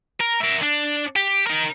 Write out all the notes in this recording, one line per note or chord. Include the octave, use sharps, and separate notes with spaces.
A#4
A#4 E5
D4
G4
D#4 A#4